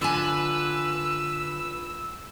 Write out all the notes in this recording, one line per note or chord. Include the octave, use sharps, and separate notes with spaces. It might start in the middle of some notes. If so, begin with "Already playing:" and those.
D3 F4 B4 G#5 E6